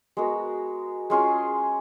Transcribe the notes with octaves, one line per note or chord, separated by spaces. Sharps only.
G#3 B3 F#4 A#4
G#3 C#4 F4 G#4